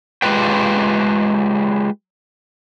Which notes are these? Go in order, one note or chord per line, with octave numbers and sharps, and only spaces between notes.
G#3 F4 G4 B4 G5